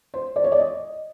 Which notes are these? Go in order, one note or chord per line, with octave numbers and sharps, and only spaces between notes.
C5
D5
C#5
D5
D#5